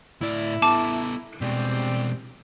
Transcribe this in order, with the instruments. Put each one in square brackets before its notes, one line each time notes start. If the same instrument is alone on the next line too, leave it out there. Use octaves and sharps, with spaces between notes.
[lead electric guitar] A2 D5 [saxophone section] E4
[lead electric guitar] B3 A4 [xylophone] A5 D6
[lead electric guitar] B2 G#3 [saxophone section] G3 C4